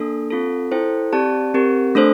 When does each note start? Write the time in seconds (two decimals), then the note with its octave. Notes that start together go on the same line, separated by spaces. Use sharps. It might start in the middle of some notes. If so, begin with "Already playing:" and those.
Already playing: A#3 D4 A4
0.30 C4 F4 A4
0.71 E4 A4 C5 G5
1.13 C4 G4 D5 A5
1.54 C4 G4 A#4
1.95 A3 D4 A4 C5